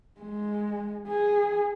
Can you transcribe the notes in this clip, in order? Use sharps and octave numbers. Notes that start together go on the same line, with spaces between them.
G#3
G#4